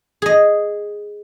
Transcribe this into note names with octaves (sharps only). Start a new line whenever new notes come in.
G#4 D#5